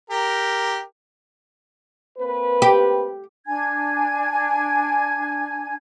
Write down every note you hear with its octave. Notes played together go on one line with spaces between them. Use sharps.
G4 A#4
A#3 C4 B4
G4
D4 G#5 G#6